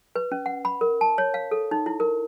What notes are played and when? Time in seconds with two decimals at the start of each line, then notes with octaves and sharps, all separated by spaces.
0.16 B4
0.32 C#4
0.46 F#5
0.65 B5
0.81 A#4
1.01 A5
1.18 C#5
1.34 F5
1.51 A4
1.71 D#4
1.86 E4
2.00 A#4